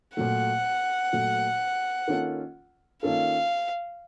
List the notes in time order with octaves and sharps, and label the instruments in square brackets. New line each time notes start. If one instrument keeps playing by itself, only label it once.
[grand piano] A#2 F#3 A3 [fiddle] F#5
[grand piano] A#2 F#3 A3
D#3 A#3 C#4 F4 A4
[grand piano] D#3 A#3 C#4 F4 A4 [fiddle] F5